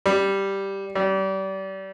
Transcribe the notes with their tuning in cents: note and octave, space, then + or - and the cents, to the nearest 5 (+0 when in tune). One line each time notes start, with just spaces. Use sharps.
G3 +0
G3 -30